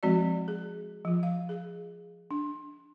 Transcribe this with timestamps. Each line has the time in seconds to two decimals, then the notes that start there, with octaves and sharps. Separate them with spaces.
0.03 F3 G#3 C4 F#4 D5
0.48 G#4
1.05 F3 F4
1.23 F5
1.49 G#4
2.31 D4